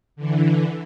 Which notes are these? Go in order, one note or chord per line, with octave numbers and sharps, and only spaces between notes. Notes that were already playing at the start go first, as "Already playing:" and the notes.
D3 E3